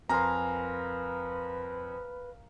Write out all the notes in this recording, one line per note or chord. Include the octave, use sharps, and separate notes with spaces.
F2 A#4 B4 F5 G#5 A#5 C6